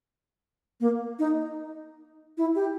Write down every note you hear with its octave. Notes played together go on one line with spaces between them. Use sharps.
A#3
D#4
E4
G4